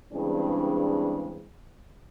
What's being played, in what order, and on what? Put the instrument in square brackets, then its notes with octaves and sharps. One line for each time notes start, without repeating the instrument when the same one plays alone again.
[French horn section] G2 C#3 E3 G#3 C4 D4